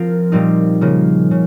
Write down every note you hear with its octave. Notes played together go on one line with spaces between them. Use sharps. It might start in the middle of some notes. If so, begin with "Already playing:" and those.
Already playing: F3 C4 F4 A#4
A#2 G3 C4 D#4
C#3 F3 A#3
C#3